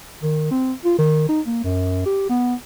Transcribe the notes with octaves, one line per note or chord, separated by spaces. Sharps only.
D#3
C4
F4
D#3
D#4
A#3
F#2
G4
B3